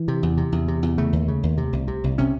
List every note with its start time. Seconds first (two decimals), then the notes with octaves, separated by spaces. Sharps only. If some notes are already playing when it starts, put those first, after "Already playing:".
Already playing: E3
0.08 C3
0.23 E2
0.37 C3
0.52 E2
0.68 C3
0.83 E2
0.98 C#3 A3
1.13 D#2
1.28 C#3
1.43 D#2
1.58 C3
1.73 C2
1.88 C3
2.04 C2
2.18 C3 C#4